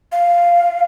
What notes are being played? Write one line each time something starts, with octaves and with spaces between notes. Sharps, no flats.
F5